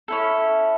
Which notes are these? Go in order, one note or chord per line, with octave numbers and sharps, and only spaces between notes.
C#4 E4 A4